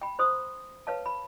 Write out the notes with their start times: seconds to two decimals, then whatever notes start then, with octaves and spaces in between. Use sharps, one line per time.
0.02 G5 B5
0.19 C5 C6 D#6
0.87 B4 C#5 F5 A5
1.06 B5